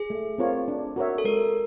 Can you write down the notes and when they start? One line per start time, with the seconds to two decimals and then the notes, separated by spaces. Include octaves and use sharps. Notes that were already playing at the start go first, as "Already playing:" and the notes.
Already playing: G#4
0.10 A3
0.38 C4 F4 A#4 C#5
0.68 D4
0.96 F#4 A#4 C#5 E5
1.18 A4
1.25 G#3 A#4